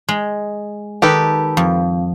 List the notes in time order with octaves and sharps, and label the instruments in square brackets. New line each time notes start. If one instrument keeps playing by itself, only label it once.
[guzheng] G#3
[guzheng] D#3 [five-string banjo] G4 A4 B4
[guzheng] F2